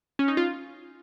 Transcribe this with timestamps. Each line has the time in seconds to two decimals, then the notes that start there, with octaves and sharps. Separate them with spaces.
0.19 C#4
0.28 D#4
0.37 F4